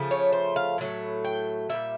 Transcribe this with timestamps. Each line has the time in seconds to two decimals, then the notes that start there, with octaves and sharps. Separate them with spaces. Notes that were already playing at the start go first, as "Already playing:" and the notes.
Already playing: C#3 F3 A3
0.11 C#5
0.33 C5
0.56 F5
0.78 A2 F#3 A3
1.24 G5
1.69 A#2 G3 E5